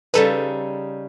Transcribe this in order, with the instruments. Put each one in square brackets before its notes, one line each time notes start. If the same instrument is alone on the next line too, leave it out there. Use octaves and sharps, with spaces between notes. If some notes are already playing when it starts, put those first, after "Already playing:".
[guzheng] C#3 G3 D#4 [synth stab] A4 B4